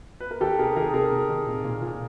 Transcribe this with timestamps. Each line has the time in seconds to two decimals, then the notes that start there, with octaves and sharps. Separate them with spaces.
0.20 B4
0.31 A#4
0.41 D#3 G4 A4
0.59 C3 G#4 A#4
0.76 D#3 G#4 A#4
0.93 C3 G#4 A#4
1.11 C3
1.29 D#3
1.47 A#2
1.64 A#2
1.82 A#2